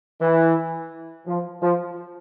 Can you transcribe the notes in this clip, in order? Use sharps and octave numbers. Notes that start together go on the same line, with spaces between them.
E3
F3
F3